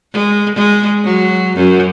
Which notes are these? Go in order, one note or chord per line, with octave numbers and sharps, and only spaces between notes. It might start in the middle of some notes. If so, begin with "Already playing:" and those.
G#3
G#3
F#3
F#2